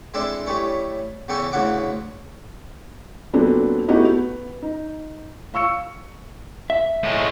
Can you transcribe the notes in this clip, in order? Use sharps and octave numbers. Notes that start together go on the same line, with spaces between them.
G#3 C4 D4 E4 A4
A2 G3 A3 C#4
E2 C#3 G4 A4 G#5 C#6
A1 D2 C#3 E4 F#5 D6
A#2 F#3 B3 C4 D4 A4
A3 B3 D#4 E4 F#4 G4
B3
D#4
F5 C#6 E6 C#7
E5
A2 G#3